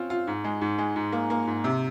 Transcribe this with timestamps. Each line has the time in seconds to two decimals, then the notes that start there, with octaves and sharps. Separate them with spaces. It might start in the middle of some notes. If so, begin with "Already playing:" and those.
Already playing: C4 C#4 F4
0.10 F4
0.27 G#2
0.44 G#3
0.61 G#2
0.78 G#3
0.96 G#2
1.12 A#3
1.30 A#3
1.47 G#2
1.64 C3